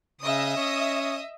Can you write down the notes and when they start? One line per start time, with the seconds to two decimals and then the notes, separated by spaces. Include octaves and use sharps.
0.21 C#3 D#5 E5 D#6
0.57 C#4